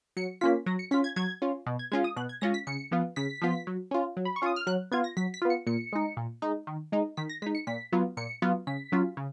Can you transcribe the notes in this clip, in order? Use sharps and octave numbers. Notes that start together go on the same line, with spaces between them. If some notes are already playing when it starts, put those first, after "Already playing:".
F#3 C#7
A#3 C#4 F4 B6
F#3 A#6
C#7
C#4 F4 B6
G#6
F#3 G#6
C#4 F4
B2
G#6
G#3 C#4 F4 G#6
D#6
B2 F#6
G#6
G#3 C#4 F4 A#6
B6
C#3 C#7
F3 B3 F4
C#3 B6
F3 B3 F4
F#3
C#4 F4
F#3
B5
C#6
C#4 F4 D#6
F6
F#3 F#6
B3 F4 G#6
A#6
F#3 B6
B6
B3 F4
C#7
A#2 C#7
G#3 D#4
A#2
G#3 D#4
D#3
G#3 D#4
D#3 B6
A#6
G#3 D#4 B6
C#7
A#2 B6
F#3 B3 F4
A#2 C#7
F#3 B3 F4
C#3 B6
F#3 C#4 F4
C#3